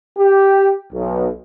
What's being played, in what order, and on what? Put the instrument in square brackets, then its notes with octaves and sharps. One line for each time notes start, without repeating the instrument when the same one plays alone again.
[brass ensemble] G4
B1